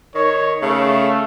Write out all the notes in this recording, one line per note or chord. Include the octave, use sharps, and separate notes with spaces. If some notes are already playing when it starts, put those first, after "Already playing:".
D#3 C#5
C#3 A3